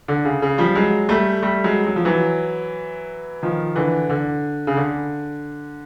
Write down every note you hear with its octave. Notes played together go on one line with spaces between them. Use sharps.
D3
C#3
C#3
F3 G3
F#3 G#3
G3 A3
G3 A3
F#3 G#3
F#3
F3
E3 F#3
D#3 F3
D3 E3
D3
C#3
D3